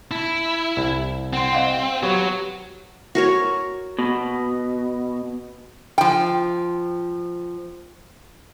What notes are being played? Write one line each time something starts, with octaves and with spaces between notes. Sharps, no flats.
E4 A5
C2
C4 F#5 C6
D#5 F5 F#5
F#3 B3 G4 C#5
F#4 A#4 C#5
B2
F3 G5